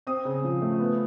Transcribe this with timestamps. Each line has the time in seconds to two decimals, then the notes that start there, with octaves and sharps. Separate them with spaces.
0.07 C4 D#6
0.25 C#3
0.44 F3
0.62 A3
0.80 B3